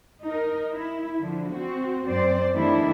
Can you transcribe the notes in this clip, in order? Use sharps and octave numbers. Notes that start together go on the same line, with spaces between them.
D#4 A#4
E4
D3 F3
C4 F#4
F#2 C4 C5 D5
D#3 E3 G3 A3 D4 E4